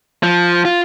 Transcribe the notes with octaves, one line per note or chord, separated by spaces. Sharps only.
F3
F4